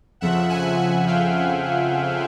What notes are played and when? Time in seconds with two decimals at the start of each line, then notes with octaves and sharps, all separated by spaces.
0.21 F2 C#3 F3 E5 F#5
0.50 F#5 G#5
0.78 F#5 G#5
1.07 F5 G5
1.36 F#5 G#5
1.65 F#5 G#5